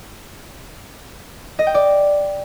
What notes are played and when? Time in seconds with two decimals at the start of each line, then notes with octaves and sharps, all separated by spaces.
1.59 D#5
1.67 G5
1.74 D5